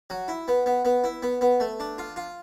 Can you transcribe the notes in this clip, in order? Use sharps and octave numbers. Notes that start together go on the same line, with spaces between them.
F#3
E4
B3
B3
B3
E4
B3
B3
A3
D4
F4
F4